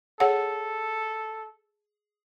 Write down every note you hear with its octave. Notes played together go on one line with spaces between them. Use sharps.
G#4 A4 C#5 F#5